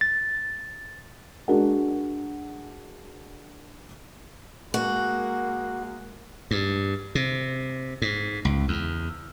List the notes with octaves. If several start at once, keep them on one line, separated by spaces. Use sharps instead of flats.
A6
G#3 D4 F#4 A#4 F#5
G#3 A#3 F#4
G2
C3
G#2
C#2
E2